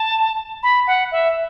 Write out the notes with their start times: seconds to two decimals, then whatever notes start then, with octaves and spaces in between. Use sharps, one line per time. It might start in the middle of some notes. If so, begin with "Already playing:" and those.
Already playing: A5
0.63 B5
0.87 F#5
1.11 E5